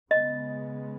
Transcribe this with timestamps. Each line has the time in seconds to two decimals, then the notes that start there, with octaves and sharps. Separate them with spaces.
0.10 C#3 G#3 B3 D#5